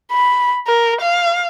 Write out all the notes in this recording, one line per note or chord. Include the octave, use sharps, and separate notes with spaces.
B5
A#4
F5